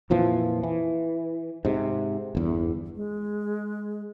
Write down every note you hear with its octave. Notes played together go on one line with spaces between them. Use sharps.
F2 A#2 E3 F3
E3
G#2 C3
G1 E2
G#3